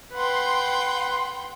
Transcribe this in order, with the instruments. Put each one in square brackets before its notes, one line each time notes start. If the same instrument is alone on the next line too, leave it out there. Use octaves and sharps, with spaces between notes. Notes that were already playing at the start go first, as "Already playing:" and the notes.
[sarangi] B4 [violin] F#5 G5 [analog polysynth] C6